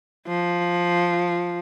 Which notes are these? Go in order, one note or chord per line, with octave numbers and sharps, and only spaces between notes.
F3